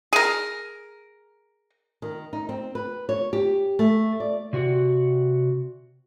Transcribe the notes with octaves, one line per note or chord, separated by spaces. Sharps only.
G#4 A#4
D#3
D#4
C4
B4
C#5
G4
A3
D5
C3 F#4 D5 F#5